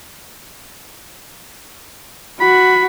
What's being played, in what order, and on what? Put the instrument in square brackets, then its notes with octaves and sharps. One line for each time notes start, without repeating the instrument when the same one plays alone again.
[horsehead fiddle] F#4 [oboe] B5